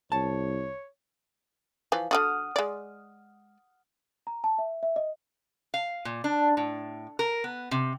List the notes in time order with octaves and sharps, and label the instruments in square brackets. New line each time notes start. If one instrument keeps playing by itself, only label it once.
[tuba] C2 [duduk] C#5 [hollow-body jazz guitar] A5
[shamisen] E3 F3
[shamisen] D3 D#3 F#4 [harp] F#5 D#6 F6
[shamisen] G#3 D5
[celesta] A#5
A5
E5
E5
D#5
[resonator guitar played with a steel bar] F5
A#2
D4
A2
A#4
B3
C3